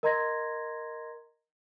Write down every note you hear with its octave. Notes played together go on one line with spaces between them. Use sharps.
A#4 D#5 A#5 C6 G#6 A#6